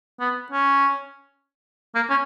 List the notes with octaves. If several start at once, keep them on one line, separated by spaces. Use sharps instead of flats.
B3
C#4
A#3
C#4